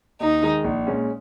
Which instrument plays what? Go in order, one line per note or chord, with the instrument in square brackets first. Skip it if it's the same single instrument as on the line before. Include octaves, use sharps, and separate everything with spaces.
[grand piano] D#2 [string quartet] D#4
[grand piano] D#3 G#3
A#1
A#2 G#3 C#4